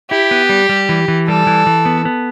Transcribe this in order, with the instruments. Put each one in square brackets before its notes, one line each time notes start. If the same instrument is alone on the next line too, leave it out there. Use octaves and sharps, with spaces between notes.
[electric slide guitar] E4 [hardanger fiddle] G4
[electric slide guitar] B3
G3
G3
E3
E3
[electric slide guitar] G3 [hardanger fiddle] A4
[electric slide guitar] E3
E3
B3
B3